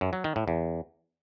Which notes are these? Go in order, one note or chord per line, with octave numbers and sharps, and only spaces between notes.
F#2
F#3
D#3
A2
E2